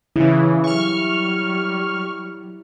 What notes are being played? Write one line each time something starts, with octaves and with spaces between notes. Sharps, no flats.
C#3 E3 E4
F#3 G3 C#6 F6